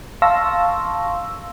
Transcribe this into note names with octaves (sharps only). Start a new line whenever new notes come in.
F5 A5 C6 C#6 E6 A#6